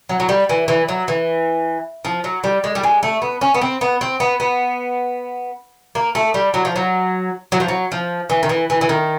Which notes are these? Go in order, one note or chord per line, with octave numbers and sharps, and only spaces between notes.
F#3
F#3
G3
E3
E3
F#3
E3
F3
F#3
G3
G#3
G3
G#3
A3
B3
C#4
B3
C4
B3
C4
B3
B3
A#3
A3
G3
F#3
F3
F#3
F#3
F3
F#3
F3
E3
D#3
E3
E3
E3
D#3